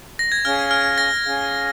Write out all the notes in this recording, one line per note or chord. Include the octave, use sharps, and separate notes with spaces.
A#6
G#6
C#4 G#4 F5 G#5 F6
F6
A#6
C#4 G#4 F5 G#5